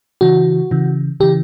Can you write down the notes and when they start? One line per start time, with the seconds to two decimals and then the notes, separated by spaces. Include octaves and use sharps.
0.21 C#3 E3 F#4
0.71 C#3 E3
1.20 C#3 E3 G4